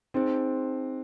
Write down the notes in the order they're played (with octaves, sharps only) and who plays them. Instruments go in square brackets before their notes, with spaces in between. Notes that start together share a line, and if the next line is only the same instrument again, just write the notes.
[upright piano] C4 [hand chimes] D#4 G#4 C5